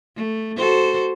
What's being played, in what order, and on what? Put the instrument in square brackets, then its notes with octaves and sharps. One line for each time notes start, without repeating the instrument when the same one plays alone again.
[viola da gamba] A3
F#4 A4 C5